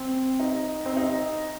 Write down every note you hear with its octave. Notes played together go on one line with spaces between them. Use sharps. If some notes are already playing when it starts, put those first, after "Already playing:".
Already playing: C4
D#4
C4
D#4